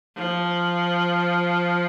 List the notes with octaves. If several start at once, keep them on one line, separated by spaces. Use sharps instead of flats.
F3